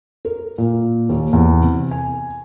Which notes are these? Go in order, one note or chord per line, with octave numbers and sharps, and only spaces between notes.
A#4
A#2
D#2
E2
C3
G#5